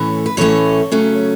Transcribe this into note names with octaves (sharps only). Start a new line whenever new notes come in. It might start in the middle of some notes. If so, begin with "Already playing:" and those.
Already playing: A2 E3 A3 C#4
B4
A2 E3 A3 C#4 A4 C#5
C#3 F#3 A3 C#4